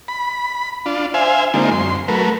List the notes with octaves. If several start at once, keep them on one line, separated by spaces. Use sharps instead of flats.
B5
D4 F4
C5 E5 F5 G#5
D3 G#3 A#3 C4 D#4 F4
F#2 C6
F#3 A3 A#4 B4